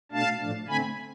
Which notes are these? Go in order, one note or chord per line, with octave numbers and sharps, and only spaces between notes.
B2 A3 D4 F5 A5
A2 F3 A3 D4
D3 A3 C4 G#5 B5